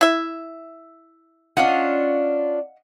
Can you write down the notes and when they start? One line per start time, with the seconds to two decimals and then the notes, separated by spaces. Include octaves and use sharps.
0.01 E4 E5
1.57 C#4 D4 F4 D#5 F5 F#5